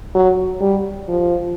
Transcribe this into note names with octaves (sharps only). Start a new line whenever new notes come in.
F#3
G3
F3